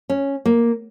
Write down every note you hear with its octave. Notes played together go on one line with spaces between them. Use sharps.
C#4
A#3